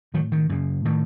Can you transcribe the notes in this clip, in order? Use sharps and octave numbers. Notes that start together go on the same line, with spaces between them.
A2 D#3 F#3
D#3
F#2 C#3
A2 D#3